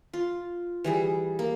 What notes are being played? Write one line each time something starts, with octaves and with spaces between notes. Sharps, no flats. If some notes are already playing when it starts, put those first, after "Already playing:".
F4
E3 G3 G#4
A#3